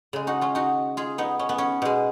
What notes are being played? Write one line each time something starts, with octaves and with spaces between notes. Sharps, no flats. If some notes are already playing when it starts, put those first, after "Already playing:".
C#3 G#3
D#4 F#4
C#4 F4
D#4 F#4
F4 G#4
B3 D#4
C#4
B3
C#4
B2 G#3